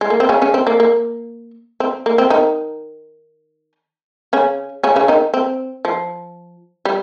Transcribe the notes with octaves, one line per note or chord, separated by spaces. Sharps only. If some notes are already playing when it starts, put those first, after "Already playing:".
G#3
A#3
C4
C#3 C#4
C#3 C#4
C4
A#3
A#3
C4
A#3
C4
D#3 D#4
C#3 C#4
C#3 C#4
C#3 C#4
D#3 D#4
C4
F3
G3